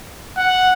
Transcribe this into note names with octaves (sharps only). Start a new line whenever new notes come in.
F#5